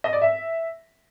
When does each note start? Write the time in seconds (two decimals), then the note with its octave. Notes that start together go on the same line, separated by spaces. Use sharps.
0.04 D#5
0.13 D5
0.21 E5